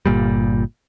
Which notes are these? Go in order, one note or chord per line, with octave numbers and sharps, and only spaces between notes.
G1 A#2 G3